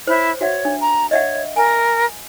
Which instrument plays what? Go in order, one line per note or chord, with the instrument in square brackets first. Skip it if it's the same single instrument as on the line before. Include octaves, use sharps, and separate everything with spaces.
[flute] E4 [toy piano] C5 C#5
[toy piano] F#4 E5 F#5 [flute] C#5
[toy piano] D4
[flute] A#5
[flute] C#5 [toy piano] D#5 E5 F#5
[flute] A#4 [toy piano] G#5